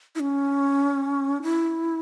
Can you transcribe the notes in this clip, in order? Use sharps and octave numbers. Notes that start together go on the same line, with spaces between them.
E4
C#4
E4